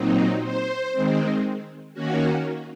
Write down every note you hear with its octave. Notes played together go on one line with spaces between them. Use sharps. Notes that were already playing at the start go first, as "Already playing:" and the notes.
Already playing: A#2 F#3 C4 D#4
C5
D#3 G#3 C4
D#3 A#3 C#4 F#4